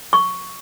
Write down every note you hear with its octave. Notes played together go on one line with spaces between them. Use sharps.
C#6